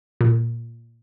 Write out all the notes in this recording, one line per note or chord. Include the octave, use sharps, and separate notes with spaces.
A#2